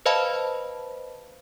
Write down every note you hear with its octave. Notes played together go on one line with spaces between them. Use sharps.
B4 C5 D#5 F5 A5 B5